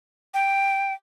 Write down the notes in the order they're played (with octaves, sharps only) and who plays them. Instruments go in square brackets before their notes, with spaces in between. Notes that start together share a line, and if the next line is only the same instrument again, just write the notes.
[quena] G5